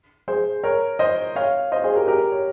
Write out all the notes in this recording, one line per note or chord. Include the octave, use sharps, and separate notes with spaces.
G#4 C5
A#4 C#5
C5 D#5
C#5 F5
C5 D#5
G#4 C5
G4 A#4
G4 A#4
C#5